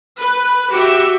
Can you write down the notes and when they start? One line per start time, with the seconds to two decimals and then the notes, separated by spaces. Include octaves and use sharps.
0.19 B4
0.71 F#4 G4 E5